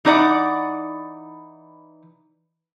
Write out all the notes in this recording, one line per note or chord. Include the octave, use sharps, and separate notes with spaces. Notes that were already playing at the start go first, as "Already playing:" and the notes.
E3 D#4 D5 F#5